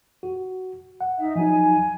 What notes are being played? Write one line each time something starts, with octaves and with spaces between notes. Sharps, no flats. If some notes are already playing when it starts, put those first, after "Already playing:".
F#4
F#5
D#4 E5
F3 F#3 D#4 G#5